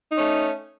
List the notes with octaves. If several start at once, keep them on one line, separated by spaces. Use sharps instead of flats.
A3 C#4 D#4